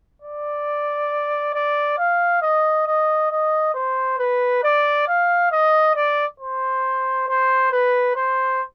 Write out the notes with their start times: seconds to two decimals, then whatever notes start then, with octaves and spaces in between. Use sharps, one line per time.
0.22 D5
1.54 D5
1.98 F5
2.42 D#5
2.87 D#5
3.31 D#5
3.74 C5
4.18 B4
4.64 D5
5.08 F5
5.52 D#5
5.95 D5
6.40 C5
7.28 C5
7.72 B4
8.16 C5